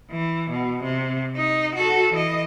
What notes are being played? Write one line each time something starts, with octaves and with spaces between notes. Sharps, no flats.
E3
B2
C3
D#4
F#4 A4
E3 D#5